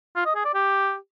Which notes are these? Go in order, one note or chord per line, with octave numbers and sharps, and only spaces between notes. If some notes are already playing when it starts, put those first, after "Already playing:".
F4
D#5
G#4
D5
G4